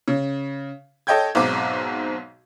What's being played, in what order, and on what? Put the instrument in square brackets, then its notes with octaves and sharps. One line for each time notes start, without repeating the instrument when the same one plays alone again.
[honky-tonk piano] C#3
A4 C#5 D#5 G5 G6 G#6
B1 G#2 C4 D6